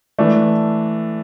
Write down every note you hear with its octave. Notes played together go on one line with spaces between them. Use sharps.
E3 A3 D4